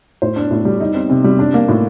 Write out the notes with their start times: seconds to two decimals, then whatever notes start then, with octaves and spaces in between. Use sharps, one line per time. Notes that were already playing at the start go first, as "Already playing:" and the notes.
0.22 A2 C5
0.36 D4
0.51 A2
0.65 G3
0.80 D#4
0.95 C4
1.10 C3
1.24 G3
1.39 D4
1.54 A#3
1.69 A2